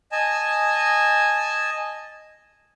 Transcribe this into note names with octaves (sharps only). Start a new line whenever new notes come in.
D#5 G#5 A5